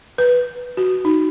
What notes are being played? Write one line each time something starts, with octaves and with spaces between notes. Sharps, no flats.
B4
F#4
D#4